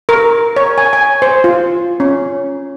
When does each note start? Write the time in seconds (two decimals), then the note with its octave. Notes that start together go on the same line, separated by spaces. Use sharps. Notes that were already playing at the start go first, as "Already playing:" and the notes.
0.09 A#4
0.56 C#5
0.78 G#5
0.93 G#5
1.22 C5
1.44 F4
2.00 C#4